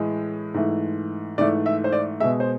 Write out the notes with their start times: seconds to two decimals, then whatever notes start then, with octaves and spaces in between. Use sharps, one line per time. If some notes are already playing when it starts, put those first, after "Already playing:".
Already playing: A2 E3 G#3
0.54 G#2 E3 A3
1.38 G#2 E3 A3 D5
1.66 E5
1.84 C5
1.92 D5
2.20 B2 G#3 E5
2.40 C5